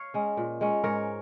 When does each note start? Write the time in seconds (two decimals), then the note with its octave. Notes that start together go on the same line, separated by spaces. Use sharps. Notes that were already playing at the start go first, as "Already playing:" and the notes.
Already playing: C#5 F5
0.14 G#3 C#4
0.37 A#2
0.61 G#3 C#4
0.84 G#2 A#4 C#5